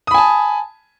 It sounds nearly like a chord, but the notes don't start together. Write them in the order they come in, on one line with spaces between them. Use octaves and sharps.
D#6 B5 G#5 A5